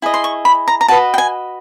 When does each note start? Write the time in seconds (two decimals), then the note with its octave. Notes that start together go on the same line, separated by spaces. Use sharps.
0.02 E4 G#4 D#5
0.14 C6
0.24 C#6
0.45 B5
0.68 A#5
0.81 A#5
0.88 F#4 B4 D#5 A5
1.14 G5
1.18 G#5